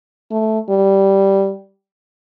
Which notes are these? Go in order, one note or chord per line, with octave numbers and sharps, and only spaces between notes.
A3
G3